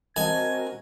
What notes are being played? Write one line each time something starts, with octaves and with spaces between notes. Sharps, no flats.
C4 F#4 A#4 D#5 G#5 A5 G#6